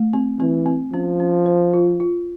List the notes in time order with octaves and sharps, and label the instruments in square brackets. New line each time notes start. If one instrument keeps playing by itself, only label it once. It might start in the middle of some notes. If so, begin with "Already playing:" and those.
Already playing: [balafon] A3
C4
[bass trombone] E3 [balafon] C4
[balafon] C4
[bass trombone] F3 [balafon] C#4
[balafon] C#4
C5
F4
F4